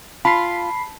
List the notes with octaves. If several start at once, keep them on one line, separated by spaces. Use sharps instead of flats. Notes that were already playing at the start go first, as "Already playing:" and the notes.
F4 A5 B5 B6 C7